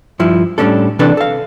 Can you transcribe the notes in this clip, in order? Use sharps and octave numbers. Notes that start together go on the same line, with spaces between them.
G2 F3 E4
A2 G3 A3 C#4 D4 A4
C3 E3 D4 A4 B4 D5
A4 F5